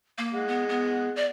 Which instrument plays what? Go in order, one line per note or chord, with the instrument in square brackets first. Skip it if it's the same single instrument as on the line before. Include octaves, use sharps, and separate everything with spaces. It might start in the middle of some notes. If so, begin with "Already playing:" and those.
[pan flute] A#3
[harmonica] G#3 F#5
[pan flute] B3
B3
D5